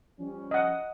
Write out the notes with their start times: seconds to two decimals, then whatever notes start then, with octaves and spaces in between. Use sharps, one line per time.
0.19 F3 G3 C#4
0.51 D#5 F#5